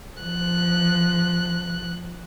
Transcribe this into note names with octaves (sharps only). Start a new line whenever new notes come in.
F3 F#6